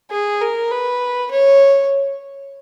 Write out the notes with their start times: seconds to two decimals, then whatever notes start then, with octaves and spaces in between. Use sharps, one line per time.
0.11 G#4
0.41 A#4
0.71 B4
1.31 C#5